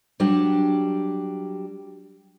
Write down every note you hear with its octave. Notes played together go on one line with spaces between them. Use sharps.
F#3 G3 D4 G4